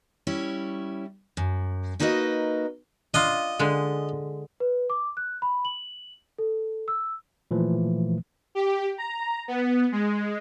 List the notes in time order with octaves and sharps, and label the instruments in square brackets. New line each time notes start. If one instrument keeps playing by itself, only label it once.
[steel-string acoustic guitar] G3 C#4 E4 C#5
F#2
A#3 D#4 F#4 A#4 B4 D#5
[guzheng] D4 F4 [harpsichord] D#5
[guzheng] D3 G#3
[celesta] B4
D6
F#6
B5
F#7
A4
E6
[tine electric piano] A#2 E3 F3 A3
[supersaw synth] G4
A#5
B3
G#3